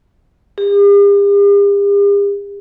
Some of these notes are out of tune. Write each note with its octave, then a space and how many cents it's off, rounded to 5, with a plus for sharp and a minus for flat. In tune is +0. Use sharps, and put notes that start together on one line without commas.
G4 +45